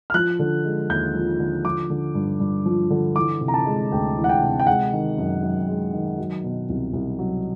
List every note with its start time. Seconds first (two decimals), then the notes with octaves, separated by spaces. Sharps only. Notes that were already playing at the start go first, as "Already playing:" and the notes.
0.10 F6
0.14 F3 F#6
0.39 D3
0.65 G#3
0.89 D#2 G6
1.15 F3
1.39 D3
1.65 F3 D6
1.90 D3
2.15 G2
2.40 G2
2.66 F3
2.90 D3
3.16 E3 D6
3.41 C3
3.48 A#5
3.54 A5
3.66 G#3
3.92 D2 G5
4.17 E3
4.24 F#5
4.29 G5
4.42 C3
4.60 G5
4.67 G#3 F#5
4.93 D#3
5.18 F#2
5.42 F#2
5.68 G#3
5.94 D#3
6.18 F#3
6.44 B2
6.69 C2
6.93 C2
7.19 F#3